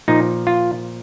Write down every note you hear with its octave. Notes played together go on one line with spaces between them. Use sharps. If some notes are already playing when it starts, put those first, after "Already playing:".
A#2 F3 D#4
F4